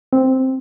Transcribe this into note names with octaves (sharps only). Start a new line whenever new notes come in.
C4